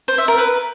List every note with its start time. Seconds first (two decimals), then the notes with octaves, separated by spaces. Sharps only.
0.08 C5
0.18 E5
0.28 A#4
0.38 B4